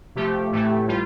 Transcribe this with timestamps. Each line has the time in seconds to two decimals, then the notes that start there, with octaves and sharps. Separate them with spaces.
0.15 C3 F3 A3 G4
0.52 A2 E3 A3
0.88 G3 F4